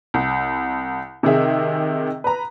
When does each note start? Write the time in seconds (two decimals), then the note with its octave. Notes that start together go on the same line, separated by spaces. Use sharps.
0.14 C2
1.23 C3 D#3 G#4 E5
2.24 B4 A#5